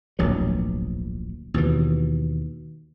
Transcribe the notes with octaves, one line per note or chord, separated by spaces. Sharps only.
D1 A#1 B2 F#3
D#2 B2 E3